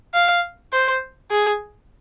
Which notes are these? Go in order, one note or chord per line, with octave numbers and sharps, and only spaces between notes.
F5
C5
G#4